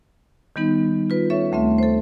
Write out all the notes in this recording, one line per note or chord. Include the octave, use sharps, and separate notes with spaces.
D#3 G3 B3 D#4
F4 B4
C#4 A4 C#5 E5
D2 A3 C4 E5
A4 C5